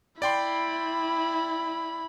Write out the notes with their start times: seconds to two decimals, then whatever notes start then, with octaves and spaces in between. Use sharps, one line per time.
0.22 E4 D5 G5 B5 C6